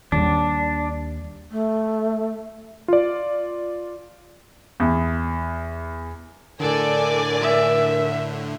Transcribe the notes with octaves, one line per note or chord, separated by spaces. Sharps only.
D#2 G3 D4
A3
F4 D5
E2
A2 D3 A4 A#4 D5 G#5
E5